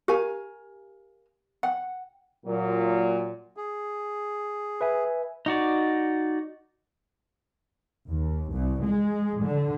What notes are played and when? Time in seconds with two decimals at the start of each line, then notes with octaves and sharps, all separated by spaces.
0.08 G4 A#4 F5 G#5
1.63 F#5 G5
2.46 A#2 F#3
3.57 G#4
4.81 B4 E5 G#5
5.46 D#4 F#4 D5
8.09 D#2
8.53 C2
8.85 G#3
9.43 D3